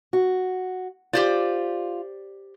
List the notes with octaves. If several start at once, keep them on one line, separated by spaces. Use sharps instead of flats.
F#4
F4 G4 C5 D5